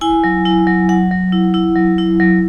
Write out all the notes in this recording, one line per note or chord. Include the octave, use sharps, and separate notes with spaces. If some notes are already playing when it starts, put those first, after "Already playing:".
E4 G#5
F#3
E4
F#3
F#3 F#5
F#3
E4
E4
F#3
E4
F#3